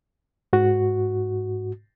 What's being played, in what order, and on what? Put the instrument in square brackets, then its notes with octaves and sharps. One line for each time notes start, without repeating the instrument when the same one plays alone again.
[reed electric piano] G#2 F#4